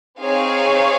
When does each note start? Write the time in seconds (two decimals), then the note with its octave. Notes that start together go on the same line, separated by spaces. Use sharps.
0.21 C4 D#4 G#4 C#5 F5